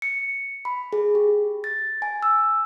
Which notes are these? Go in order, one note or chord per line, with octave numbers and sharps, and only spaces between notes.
C#7
B5
G#4
G4
A6
G#5
E6